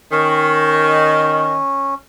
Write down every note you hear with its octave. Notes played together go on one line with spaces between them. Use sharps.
D#3 C#4